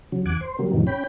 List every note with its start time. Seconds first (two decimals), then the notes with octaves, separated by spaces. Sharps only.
0.12 C#3 F#3
0.26 E2 F#5 G#5 D6
0.41 C5
0.59 C#3 F#3 G3 A#3
0.73 F2 A2 C3 D#3 E3 F#3
0.87 C#4 G5 B5